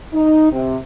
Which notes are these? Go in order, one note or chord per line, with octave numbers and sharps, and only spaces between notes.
D#4
C3